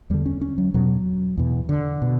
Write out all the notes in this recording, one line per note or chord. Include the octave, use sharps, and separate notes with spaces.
E2 D3 G3
C#4
C#4
F#3
E2 B2 F#3
E2 B2
D3
B2